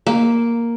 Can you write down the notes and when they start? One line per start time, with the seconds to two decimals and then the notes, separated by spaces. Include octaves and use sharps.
0.06 A#3